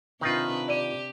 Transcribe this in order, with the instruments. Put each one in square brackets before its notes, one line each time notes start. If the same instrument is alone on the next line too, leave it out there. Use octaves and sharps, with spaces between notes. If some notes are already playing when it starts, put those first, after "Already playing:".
[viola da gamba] C3 D4 B4 [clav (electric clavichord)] D#3 D#4 F4
[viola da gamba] G4 [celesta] D5 D#7